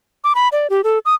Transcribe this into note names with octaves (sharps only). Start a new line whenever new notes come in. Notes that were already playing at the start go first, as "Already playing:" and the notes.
D6
B5
D5
G4
A4
D#6